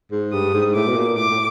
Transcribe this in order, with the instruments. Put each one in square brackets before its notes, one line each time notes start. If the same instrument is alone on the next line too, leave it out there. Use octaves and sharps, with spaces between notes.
[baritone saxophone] G#2
[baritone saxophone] G2 [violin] D#6
[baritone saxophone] G#2
[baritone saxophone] A2 [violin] D6
[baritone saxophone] B2
A#2
[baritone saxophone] A2 [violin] D6
[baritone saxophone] A2